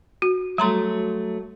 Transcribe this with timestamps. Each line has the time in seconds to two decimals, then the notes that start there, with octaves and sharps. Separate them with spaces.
0.22 F#4
0.58 F#3 G3 A3 A#5 C6